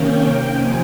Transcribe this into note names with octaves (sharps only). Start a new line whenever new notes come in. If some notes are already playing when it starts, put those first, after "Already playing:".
Already playing: C3 D#3 A#3 C#4 G5
C3 F3 C4 D#4 G#5